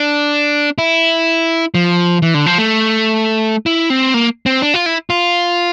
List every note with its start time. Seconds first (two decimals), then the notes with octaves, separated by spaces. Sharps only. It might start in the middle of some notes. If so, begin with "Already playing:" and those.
Already playing: D4
0.78 E4
1.75 F3
2.22 E3
2.34 D3
2.46 F3
2.58 A3
3.66 E4
3.90 C4
4.14 A#3
4.46 C4
4.62 D4
4.74 F4
4.86 E4
5.10 F4